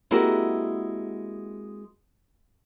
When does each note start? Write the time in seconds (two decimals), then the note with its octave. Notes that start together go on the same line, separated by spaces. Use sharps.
0.11 G#3 A#3 C4 E4 F#4 G4